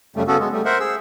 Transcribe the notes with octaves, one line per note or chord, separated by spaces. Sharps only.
F#2 C#3 G3 A3
C#3 B3 C#4 F#4 A4
G#3 B3
G3 A3
A#4 C5 E5 F#5
G#4 E6